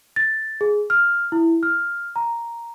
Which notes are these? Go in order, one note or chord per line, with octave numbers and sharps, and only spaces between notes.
A6
G#4
F6
E4
F6
A#5